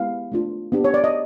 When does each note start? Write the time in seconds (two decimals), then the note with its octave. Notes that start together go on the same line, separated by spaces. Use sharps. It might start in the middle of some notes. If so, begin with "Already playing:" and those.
Already playing: G#3 B3 E4 G4 F5
0.32 A3 D4 F4
0.72 B3 D4 G4
0.84 C#5
0.94 D5
1.04 D#5